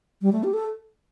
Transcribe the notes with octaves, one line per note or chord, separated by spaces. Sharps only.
G3
A3
G4
A4